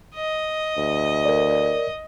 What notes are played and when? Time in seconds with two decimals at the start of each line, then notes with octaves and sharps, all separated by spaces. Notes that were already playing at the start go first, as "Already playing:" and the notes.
0.15 D#5
0.77 D2
1.25 A#4 D5